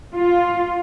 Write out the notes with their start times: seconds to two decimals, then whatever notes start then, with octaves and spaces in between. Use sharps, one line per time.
0.15 F4